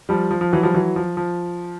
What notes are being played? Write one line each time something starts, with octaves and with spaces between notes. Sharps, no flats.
F3 G3
F3
F3
E3 F#3
F3 G3
E3 F#3
F3
F3